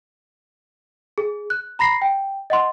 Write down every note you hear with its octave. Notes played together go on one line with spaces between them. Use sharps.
G#4
F#6
A#5 B5 A#6 C7
G5
D#5 F#5 C6